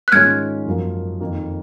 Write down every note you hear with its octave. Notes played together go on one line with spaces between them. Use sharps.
F#6
G#2 D#3 G#3 C#4 F4 F6 G#6
F#2 F3 A#3
F2 D#3 A#3